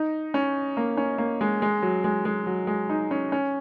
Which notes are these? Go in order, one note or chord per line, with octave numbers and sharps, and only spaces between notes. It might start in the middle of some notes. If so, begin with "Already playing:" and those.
Already playing: D#4
C#4
A#3
C#4
A#3
G#3
G#3
F#3
G#3
G#3
F#3
G#3
D#4
C#4
C#4